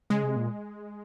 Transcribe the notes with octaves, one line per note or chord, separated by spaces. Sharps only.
C#3 G#3
C3
A#2